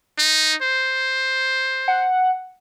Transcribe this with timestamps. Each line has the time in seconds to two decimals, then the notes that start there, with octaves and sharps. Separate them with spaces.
0.19 D#4
0.62 C5
1.88 F#5